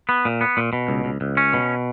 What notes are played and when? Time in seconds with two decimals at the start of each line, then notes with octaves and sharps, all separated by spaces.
0.09 B3
0.25 A#2
0.41 B3
0.57 A#2
0.73 B2
0.88 C#2
1.05 C#2
1.21 C#2
1.37 C#4
1.54 B2